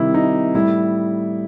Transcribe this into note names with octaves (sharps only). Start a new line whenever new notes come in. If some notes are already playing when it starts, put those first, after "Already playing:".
Already playing: C3 D#3 G3 E4
D#4
A2 G3 E4